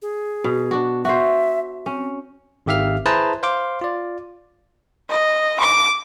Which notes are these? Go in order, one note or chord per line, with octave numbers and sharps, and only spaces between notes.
G#4
B2
D4 F#4
F#4 C5 E5
C4 C#4
G#1 D#3 G4 E5 F5 F6
E4 G#4 B4 C5 A5 A#5
C5 F5 C6 D6
F4 D5
D#5
D6